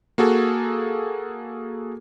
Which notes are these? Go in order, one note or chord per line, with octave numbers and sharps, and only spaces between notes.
A#3 F#4 G#4 A4